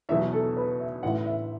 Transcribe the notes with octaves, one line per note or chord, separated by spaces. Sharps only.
E2 B2 F#3 E5
A4
B4
E5
A1 A2 E3 F#5
E5